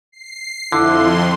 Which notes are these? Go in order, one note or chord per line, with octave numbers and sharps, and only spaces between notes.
C7
F2 D3 E4 C6